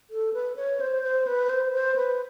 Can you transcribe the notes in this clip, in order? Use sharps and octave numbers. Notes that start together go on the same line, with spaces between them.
A4
B4
C#5
C5
C5
B4
C5
C5
B4